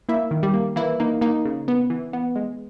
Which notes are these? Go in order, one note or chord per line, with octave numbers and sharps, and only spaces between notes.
A#3 E4 E5
D#3
G3 G4
A#3
E3 A#3 E4
A#3 D#4
A#3 D#4
C#3
B3
E3
B3
G#3